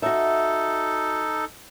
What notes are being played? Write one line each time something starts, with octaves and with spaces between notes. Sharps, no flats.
D#4 F#4 A4 E5